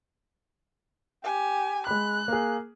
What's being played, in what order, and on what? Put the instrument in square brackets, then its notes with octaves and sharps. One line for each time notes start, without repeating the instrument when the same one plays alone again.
[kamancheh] G4 G#5
[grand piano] G#3 B5 [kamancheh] F#6
[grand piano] A#3 G#4